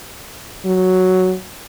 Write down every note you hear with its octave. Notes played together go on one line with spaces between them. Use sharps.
F#3